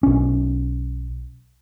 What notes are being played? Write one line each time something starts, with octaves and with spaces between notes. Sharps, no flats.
B1 C#4